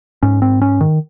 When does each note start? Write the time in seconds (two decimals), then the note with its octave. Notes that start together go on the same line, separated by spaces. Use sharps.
0.23 G#2 C#4
0.42 C4
0.62 C#4
0.81 D#3